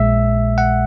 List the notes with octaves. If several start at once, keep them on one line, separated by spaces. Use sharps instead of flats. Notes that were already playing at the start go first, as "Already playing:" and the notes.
Already playing: A#1 A#2 G#3 E5
F#5